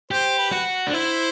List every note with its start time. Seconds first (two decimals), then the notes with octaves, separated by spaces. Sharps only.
0.11 G4 C5
0.38 B4
0.52 F#4
0.87 D4
0.94 E4 C5